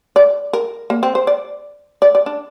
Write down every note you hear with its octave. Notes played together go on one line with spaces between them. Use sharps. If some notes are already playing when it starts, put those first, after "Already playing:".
D5
A#4
A#3
C4
C5
D5
D5
D5
D4